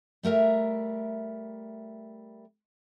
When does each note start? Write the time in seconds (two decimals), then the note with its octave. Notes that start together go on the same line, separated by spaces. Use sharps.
0.23 G3 A3 A#4 E5 A#5